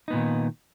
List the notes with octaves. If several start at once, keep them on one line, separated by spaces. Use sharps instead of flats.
A#2 D#3 B3 D#4